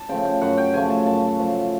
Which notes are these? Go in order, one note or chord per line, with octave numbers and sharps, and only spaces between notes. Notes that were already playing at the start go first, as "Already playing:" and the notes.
Already playing: A5
C#3 F3 A3 G5
G5
F#2 F#5
G5
C#3 F3 A3 G#5
A5
F#2 A5
C#3 F3 A3